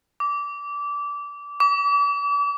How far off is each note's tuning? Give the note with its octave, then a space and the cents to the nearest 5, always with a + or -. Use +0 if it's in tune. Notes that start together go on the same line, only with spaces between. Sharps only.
D6 -20
D6 -40